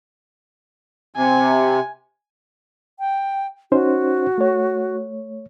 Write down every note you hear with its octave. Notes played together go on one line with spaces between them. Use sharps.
C3 G#5
G5
C#4 D#4 F#4 C5
A3 C#5